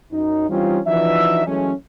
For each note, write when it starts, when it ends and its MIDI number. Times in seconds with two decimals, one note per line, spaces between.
0.12 0.48 42
0.12 0.48 63
0.49 0.78 52
0.49 0.78 55
0.49 0.78 60
0.49 0.78 61
0.49 0.78 63
0.49 0.78 65
0.86 1.45 52
0.86 1.45 53
0.86 1.45 62
0.86 1.45 63
0.86 1.45 66
0.86 1.45 76
1.46 1.71 52
1.46 1.71 54
1.46 1.71 56
1.46 1.71 57
1.46 1.71 61